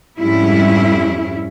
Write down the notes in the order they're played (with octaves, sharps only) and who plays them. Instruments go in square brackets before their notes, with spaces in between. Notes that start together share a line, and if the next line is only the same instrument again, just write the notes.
[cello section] F2 G#2 G3 C#4 E4